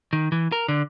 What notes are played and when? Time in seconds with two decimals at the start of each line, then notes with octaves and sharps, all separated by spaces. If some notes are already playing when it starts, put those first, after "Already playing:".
0.13 D#3
0.32 E3
0.52 A#4
0.68 D3